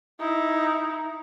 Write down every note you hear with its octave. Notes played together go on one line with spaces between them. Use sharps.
D#4 E4